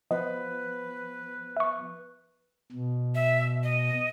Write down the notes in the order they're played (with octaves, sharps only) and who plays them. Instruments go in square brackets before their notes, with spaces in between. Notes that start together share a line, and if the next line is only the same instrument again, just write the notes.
[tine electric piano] F3 B3 [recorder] B4 [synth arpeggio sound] D#5
[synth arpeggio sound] E5 C#6
[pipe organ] B2
[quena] E5
D#5